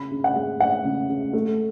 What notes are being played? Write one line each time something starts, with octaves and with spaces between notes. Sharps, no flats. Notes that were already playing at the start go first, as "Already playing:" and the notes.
Already playing: C#3 B5
C#3
F#5
G#3
G#3 F#5
C#3
C#3
A3